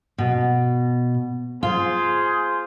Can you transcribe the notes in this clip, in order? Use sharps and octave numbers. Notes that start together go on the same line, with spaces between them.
B2
F4 G#4 C5